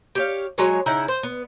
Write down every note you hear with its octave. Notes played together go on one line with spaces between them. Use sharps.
G4 C#5 F5
F#3 G#3 G#4 C#5
C#3 D#4 E4 F#5
C5
B3